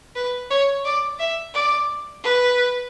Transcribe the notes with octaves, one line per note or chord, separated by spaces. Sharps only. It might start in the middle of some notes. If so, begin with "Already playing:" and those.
B4
C#5
D5
E5
D5
B4